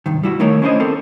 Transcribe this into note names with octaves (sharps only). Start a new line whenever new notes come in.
C2 G2 D#3
G3 E4 F#4
D#3 A3 D#4 A#4 C#5
C#4 D4 E4 C5 D#5
C4 A4 A#4